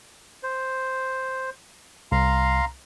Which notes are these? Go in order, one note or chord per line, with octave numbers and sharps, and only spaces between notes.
C5
C2 F5 A#5 C6